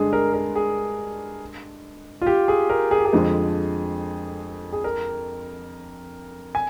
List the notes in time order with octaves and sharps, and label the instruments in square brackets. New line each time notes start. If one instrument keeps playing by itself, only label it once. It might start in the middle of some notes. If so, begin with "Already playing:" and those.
Already playing: [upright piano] G2 D3 G#3 D4 [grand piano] G#4
[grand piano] A#4
A#4
G#4
F4
G4
G#4
A#4
G#4
G4
G#4
[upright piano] F2 D3 F3 G#3
[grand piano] G#4
A#4
G#5